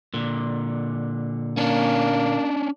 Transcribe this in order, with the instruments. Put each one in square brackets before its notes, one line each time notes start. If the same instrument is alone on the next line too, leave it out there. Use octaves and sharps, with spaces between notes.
[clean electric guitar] A#2 D3
[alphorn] A#3 [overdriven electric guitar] C#4 D4